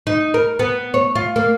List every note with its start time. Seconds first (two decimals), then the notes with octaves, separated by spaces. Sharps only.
0.07 D#4
0.34 A#4
0.59 B3
0.94 C#5
1.15 F4
1.36 A#3